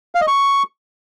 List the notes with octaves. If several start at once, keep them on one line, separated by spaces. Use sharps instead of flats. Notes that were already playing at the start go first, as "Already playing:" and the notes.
F5
D#5
C#6